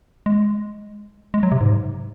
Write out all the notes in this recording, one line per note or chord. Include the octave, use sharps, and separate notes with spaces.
G#3
G#3
F#3
C3
G#2